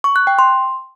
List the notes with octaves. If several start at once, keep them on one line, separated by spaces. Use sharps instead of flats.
C#6
F#6
G5
C6